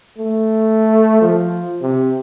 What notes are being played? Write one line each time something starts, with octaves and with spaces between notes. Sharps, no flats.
A3
F3
C3